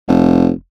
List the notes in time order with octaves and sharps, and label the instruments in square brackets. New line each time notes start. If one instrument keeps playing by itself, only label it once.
[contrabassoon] F1